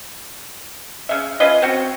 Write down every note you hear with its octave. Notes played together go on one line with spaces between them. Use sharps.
C#3 E5
C#4 F4 B4 D#5
C4 F#4